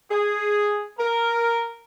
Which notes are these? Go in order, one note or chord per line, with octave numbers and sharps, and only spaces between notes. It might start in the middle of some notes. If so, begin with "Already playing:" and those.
G#4
A#4